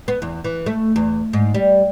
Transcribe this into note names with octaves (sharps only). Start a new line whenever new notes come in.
B3
E2
E3
A3
E2
G#2
G3